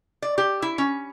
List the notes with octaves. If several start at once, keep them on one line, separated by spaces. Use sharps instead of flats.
D5
G4
E4
C#4